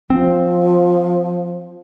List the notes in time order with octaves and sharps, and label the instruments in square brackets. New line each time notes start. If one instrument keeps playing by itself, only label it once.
[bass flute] F3 [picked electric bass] C4